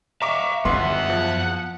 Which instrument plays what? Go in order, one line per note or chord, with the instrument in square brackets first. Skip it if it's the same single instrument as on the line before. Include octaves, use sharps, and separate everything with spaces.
[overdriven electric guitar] E5 F5 [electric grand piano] A#5 C#6 D6
[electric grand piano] G1 C6 [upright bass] F#2 [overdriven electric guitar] B3 E5 [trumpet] F#5
[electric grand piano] F3